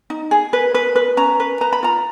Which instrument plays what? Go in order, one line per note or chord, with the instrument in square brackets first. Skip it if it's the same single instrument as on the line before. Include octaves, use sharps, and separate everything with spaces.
[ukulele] D#4
G#4
B4
B4
B4
C#4 A#5
B4
B4 A#5
B5
F4 A#5